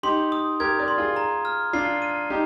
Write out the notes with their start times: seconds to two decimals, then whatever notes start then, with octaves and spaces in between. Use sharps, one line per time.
0.03 D#4 G4 C6
0.32 D#6
0.60 G4 A#4 G#6
0.79 A#4 D5
0.88 C6
0.98 F4 G#4
1.16 A#5
1.45 F6
1.73 D4 F4 C7
2.02 D#7
2.30 D#4 G4 A#5